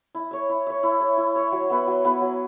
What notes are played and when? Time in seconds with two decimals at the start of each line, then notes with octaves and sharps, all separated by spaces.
0.15 E4
0.31 C#5 E5
0.49 E4
0.67 C#5 E5
0.83 E4
1.00 C#5 E5
1.17 E4
1.36 C#5 E5
1.52 F#3
1.70 B3 E4 B4
1.87 F#3
2.04 B3 E4 B4
2.22 F#3